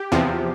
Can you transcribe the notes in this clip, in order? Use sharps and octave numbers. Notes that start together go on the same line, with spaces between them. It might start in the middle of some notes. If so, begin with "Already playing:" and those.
Already playing: G4
E2 C3 F3